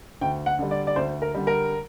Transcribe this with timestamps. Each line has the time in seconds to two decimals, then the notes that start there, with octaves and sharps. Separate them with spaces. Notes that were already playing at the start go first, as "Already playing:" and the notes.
0.21 D2 G5
0.46 F#5
0.59 D3 G3
0.71 D5
0.87 D5
0.96 D2 C5
1.22 A#4
1.34 D3 G3
1.47 A#4